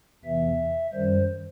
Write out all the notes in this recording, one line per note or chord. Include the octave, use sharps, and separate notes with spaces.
E2 C3 E3 E5
F#2 D#3 G3 C5